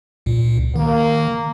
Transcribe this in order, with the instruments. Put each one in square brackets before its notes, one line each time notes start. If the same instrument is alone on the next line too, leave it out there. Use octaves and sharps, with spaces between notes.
[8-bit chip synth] C#2 A#2
[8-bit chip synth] D#3 [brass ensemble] A#3